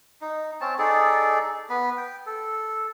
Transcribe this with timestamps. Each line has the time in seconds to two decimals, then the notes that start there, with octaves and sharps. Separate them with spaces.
0.21 D#4
0.61 C4 C#4 A5
0.79 D#4 G#4 A4 D5
1.70 B3 B4
1.97 G5
2.26 A4